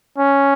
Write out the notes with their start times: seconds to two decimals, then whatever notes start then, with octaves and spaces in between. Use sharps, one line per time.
0.18 C#4